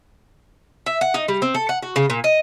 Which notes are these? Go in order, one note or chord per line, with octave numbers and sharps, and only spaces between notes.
E5
F#5
D#4
G3
C4
A4
F#5
F#4
C#3
A#2
D#5